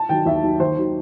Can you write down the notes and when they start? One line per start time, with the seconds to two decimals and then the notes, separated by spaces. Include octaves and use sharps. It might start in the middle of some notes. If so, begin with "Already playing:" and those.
Already playing: A5
0.09 D#3 F#3 G5
0.26 D#2 E5
0.43 D#3 F#3
0.60 D#2 C5
0.78 D#3 F#3